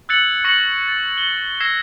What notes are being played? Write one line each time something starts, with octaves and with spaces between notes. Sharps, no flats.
E6 F#6 G#6 A6 C#7 F#7
C#6 A#6 C#7 F#7
A6
G7
E6 G#6 A#6 C7 E7